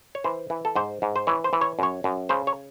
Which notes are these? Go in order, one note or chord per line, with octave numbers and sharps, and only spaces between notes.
C#5
E3 C5
E3
A4
G#2 C5
G#2
C5
E3 C#5
C5
E3
C#5
F#2 C#5
F#2
C#3 C5
C#5